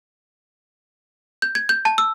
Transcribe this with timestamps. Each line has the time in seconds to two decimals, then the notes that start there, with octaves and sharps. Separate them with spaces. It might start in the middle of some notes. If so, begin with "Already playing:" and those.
1.42 G6
1.55 G#6
1.69 G6
1.85 A5
1.98 E6